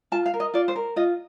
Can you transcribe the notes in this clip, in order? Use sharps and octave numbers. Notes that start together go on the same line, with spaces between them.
F4 A5
F5
A#4
D#5
F4 D5
C5
A#4
F4 D#5